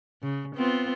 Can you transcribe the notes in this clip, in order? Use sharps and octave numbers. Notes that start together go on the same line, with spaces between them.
C#3
B3 C4 F4